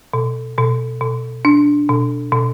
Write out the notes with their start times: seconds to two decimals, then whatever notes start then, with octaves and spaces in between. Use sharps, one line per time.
0.14 B2
0.58 B2
1.01 B2
1.45 D4
1.89 B2
2.32 B2